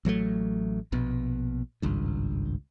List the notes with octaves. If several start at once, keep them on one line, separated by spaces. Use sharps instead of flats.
A1 F#3 G#3 A3
A#1 B2
G#1 C#2 G2